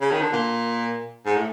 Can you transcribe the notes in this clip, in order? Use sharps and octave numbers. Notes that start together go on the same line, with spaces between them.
C#3
D#3
D3
A#2
G#2
A2